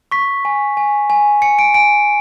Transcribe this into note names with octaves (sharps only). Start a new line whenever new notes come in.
C#6 B6
G#5
G#5
G#5
G#5 C#7
D7
G#5 D7